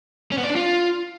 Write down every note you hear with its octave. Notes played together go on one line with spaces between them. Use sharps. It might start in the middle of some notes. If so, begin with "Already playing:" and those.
C#4
B3
D5
D4
F4